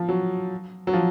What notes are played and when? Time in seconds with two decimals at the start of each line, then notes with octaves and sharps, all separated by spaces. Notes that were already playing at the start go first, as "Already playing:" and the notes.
Already playing: F3
0.09 F#3
0.87 F#3
0.93 F3